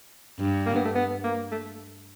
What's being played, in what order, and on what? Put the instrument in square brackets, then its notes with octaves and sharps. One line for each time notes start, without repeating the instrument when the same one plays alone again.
[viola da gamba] G2
[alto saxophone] A#3
B3
A3
B3
A#3
A3